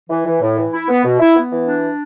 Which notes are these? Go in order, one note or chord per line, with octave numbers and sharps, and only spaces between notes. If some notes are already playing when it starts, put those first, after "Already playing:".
E3
E3
A2
E3
E4
B3
B2
E4
B3
E3
D4